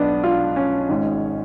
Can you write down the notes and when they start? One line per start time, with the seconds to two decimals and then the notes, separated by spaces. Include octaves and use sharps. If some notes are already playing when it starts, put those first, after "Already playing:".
Already playing: B1 B2 B3 D4
0.24 F4
0.56 C#4
0.89 G#1 G#2